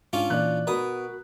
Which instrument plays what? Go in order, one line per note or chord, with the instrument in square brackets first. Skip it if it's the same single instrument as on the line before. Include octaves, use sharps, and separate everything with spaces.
[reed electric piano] G#2 [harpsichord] C#4 D4 F4
[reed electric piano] A#2 E3 [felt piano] D5 F#6
[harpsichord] B2 D#6 [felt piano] F#4 B5 [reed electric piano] A#4